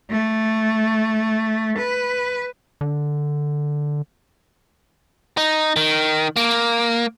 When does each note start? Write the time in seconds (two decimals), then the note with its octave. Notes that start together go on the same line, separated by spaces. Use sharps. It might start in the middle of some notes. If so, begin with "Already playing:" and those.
0.11 A3
1.78 B4
2.81 D3
5.37 D#4
5.76 D#3
6.36 A#3